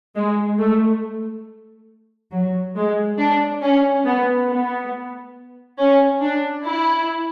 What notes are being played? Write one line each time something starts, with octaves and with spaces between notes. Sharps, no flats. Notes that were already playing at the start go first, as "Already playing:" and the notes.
G#3
A3
F#3
G#3
D4
C#4
B3
B3
C#4
D4
E4